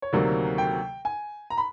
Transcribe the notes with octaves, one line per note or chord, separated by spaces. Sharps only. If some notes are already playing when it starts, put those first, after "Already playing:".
C#5
D2 C3 D#3 F#3 A#3 D5
G5
G#5
A#5
B5